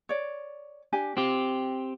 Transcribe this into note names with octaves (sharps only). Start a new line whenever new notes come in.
C#5 D5
D4 G4 G#5
C4 F4 G4